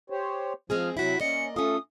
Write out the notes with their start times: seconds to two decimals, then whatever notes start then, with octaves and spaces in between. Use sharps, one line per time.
0.10 G4 C5 C#5
0.70 F3 G#3 C4 G#4 F6
0.97 C3 F#3 E4 F#4 B6
1.21 A#3 C#4 D5 D#5 C#7
1.56 A3 C#4 F4 A4 D#6